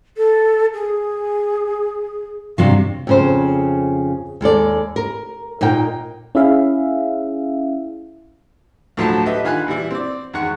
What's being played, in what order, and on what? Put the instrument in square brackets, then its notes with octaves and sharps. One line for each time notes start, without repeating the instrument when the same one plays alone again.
[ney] A4
G#4
[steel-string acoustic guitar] G2 C3 F#3 [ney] F5
[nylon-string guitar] F2 C#3 C5
D#2 G#3 A4 D5
A#4
A#2 D#4 A#4 G5
[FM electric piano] C#4 E4 G#4 E5 F5
[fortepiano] D2 A2 F3 F#3 F4 A5
G4 A4 B4 D#5 E5
D3 D#3 F4 G#5 B5 F#6
A#2 E3 G3 E4
C4 D5
E2 D#3 G#3 F#5 C#6